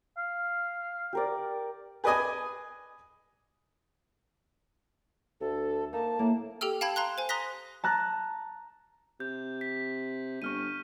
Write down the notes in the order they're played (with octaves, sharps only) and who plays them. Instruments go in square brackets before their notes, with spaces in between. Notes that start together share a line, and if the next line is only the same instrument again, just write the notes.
[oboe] F5
[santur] G4 A#4 D5
[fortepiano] G#4 B4 D5 D#5 G#5
[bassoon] D2 [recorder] A4
[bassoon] A#3 [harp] D#4 [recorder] A5
[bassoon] A2 [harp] A#3
[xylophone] G4 A4 G5 E6 F6
F5 G5 A5 B5 G#6
F5 A#5 C6 F#6
C5 G#5
A#5 C6 D#6 F#6 A#6 B6
[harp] A5 A#5 F#6
[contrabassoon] C3 [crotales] G6
[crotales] B6
[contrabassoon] G1 [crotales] C#6 F6 D#7